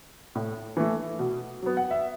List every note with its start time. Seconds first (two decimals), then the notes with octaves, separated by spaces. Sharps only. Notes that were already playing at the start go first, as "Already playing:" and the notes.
0.35 A2
0.77 E3 A3
1.19 B2
1.62 F#3 B3
1.77 F#5
1.91 E5